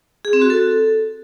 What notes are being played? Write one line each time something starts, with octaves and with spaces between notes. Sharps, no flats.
G#4
C4
F#4
A4